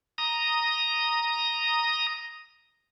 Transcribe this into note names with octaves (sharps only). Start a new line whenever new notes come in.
A#5 D#6